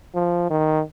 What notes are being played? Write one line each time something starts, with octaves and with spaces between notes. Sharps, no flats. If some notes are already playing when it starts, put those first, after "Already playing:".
F3
D#3